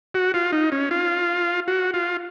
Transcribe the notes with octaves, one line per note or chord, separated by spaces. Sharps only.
F#4
F4
D#4
C#4
F4
F#4
F4